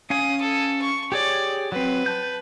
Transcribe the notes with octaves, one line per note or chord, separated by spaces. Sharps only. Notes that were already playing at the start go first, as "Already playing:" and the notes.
C#4 F5 G#5 D#6
A4
C#6
G4 G#4 C#5 D5
F#3 C4 B4
A5 G6